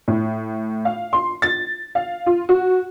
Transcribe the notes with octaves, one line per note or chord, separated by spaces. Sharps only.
A2
F5
C6
A6
F5
F4
F#4